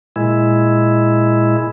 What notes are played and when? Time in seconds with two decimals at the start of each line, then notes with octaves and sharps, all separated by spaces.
0.16 A#2 G#3 E4